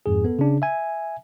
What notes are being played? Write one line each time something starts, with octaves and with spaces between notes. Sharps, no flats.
F2 G#2 G#4
B3 A4
C#3 D4
E5 G#5